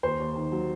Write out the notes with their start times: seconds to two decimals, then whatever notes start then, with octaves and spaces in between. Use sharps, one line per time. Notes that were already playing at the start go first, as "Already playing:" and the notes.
0.03 D#2 C5
0.20 D#2
0.36 D#3
0.52 F#3